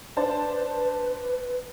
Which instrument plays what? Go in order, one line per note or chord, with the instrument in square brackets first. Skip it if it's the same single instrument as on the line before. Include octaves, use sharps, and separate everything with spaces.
[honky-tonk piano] D4 C5 A5 [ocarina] B4